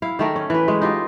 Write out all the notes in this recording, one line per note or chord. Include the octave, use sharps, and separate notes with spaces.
E4 F5
D#3 A3 A#4
C#4
E3 B4
G#3 A3
D#4 F4 G4